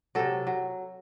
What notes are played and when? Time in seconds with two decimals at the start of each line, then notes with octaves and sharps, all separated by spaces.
0.15 C3 F#3 A4
0.47 F#3